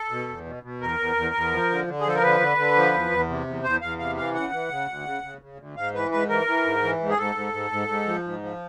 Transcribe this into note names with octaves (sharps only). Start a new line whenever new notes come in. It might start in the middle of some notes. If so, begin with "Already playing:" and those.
Already playing: A4
B2
E2
B2
B2
E2 A#4
E2
E2
E2
F3
D3
D3
G#4
F3 A4
A#4
D3 B4
D3
D3
F3
E2
E2
C3
E2
E2 C5
E2 F5
C3 F5
E3 F5
C#3 F#5
E3
C#3
D2
C#3
C#3
C#3
D2
G#2 F5
E3 B4
G#2 B4
E3 A#4
E3
G#2
E3
G#2
G#4
G#2 A4
G#2
G#2
G#2
G#2
F3
G#2
F3